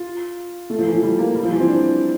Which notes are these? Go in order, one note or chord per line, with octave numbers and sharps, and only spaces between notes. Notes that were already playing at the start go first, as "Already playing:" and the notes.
Already playing: F4
A3
F3
E3
F3
G3
A#3
G3
F3
E3
C4
D4